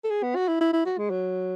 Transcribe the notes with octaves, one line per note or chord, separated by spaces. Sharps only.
A4
G#4
B3
F#4
E4
E4
E4
F#4
G#3
F#3